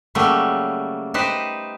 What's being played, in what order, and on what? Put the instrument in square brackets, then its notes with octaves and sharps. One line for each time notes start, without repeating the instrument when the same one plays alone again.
[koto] C#3 F#3 G3 A3 A#3
D#4 G4 B4 C5